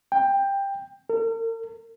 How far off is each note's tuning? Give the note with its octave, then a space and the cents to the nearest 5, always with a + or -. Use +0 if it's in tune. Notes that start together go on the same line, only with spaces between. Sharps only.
G5 +15
A#4 -45